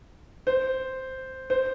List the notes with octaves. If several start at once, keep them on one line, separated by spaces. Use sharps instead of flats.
C5
C5